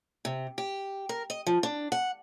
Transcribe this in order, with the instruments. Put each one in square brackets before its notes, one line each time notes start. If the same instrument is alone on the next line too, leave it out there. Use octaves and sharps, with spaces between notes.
[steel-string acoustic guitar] C3
G4
A#4
D#5
F3
D4
F#5